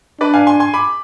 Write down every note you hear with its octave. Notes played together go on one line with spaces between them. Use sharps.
D4 B4 D5
F5 G#5
G#5 C6
G#5 C6
B5 D6